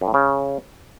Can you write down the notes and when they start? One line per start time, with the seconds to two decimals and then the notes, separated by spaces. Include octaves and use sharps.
0.01 F#2
0.08 A2
0.14 C#3